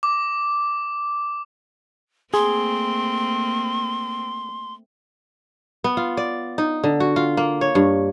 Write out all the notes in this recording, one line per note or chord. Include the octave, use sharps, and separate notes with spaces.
D6
A3 A#3 C4 G#4 C6
B3
F4
D5
D#4
D3
F#4
F4
A#3
C#5
G2